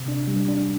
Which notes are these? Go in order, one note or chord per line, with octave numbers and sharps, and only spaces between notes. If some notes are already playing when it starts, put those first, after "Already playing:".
Already playing: C3
D4
G3
D4